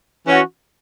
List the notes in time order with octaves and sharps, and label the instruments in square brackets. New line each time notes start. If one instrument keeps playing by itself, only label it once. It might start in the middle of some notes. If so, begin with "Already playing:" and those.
[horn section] E3 C#4 F#4